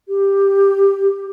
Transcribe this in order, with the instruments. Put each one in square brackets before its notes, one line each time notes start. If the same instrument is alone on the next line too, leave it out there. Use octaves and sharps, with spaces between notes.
[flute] G4